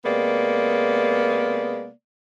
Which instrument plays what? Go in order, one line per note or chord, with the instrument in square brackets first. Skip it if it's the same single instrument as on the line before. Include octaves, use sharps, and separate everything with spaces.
[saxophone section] C3 G#3 A#3 B3 D5